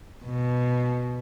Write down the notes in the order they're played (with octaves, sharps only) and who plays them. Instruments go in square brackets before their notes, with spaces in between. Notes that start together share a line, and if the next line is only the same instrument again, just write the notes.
[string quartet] B2